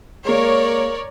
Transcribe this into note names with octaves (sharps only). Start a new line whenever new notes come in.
G#3 A#3 A#4 C#5 D5